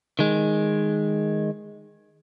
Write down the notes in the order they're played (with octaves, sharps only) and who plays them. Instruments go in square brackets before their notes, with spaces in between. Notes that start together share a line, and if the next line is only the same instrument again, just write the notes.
[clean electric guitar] D#3 G#3